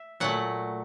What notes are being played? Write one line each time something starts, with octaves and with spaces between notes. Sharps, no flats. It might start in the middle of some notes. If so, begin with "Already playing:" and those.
Already playing: E5
A#2 F#3 A3 F#5